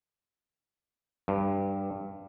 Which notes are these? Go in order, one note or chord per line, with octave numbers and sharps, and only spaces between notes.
G2